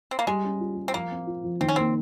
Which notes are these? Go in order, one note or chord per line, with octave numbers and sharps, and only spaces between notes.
C4
A#3
G3 G#3
C#4
F4
G3
C4
F3 A#3
C4
F4
F3
D#3 C4
C#4
A#3 C4